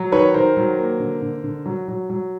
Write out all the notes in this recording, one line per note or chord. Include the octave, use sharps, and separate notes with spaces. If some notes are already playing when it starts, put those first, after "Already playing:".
Already playing: F#3
D#3 B4 C#5
D#3 A#4 C5
F#3
A#3
D3
D3
D3
F#3
F#3
F#3